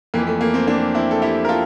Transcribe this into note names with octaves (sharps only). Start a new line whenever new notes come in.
F2 E3 A#3
A3
A#3
A3 C4
A#3 D4
C4 E4
A4
E4 G4
A#4
F4 A4